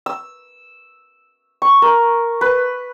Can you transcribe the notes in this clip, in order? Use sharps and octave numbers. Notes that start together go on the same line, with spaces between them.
E6
C#6
A#4
B4